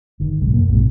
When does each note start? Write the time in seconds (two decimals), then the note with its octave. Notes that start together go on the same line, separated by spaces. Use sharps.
0.20 G1 D#3
0.41 B1 G#2 C#3
0.54 F#2 A#3
0.68 A#1 G#2 C3